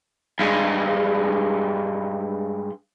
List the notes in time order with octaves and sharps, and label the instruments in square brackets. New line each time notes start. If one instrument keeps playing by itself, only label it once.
[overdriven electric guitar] G2 G#3